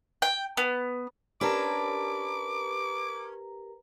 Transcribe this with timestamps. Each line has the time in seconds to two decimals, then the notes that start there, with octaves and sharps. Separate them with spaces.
0.22 G5
0.57 B3
1.41 C#4 D4 G4 A#4 B4 A#5 D6